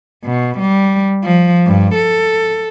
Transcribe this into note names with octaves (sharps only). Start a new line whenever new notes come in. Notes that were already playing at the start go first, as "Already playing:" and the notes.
B2
G3
F3
G2
A4